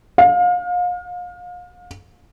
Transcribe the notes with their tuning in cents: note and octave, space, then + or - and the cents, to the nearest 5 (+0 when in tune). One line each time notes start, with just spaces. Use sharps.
F5 +35